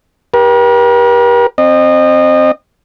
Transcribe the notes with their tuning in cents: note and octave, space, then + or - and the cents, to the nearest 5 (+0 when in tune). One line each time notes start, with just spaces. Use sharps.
G4 +0 A#4 +45
C4 +10 D#5 -25